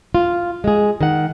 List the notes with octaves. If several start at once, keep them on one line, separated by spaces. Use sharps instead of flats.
F4
G#3 G#4
D#3 F#5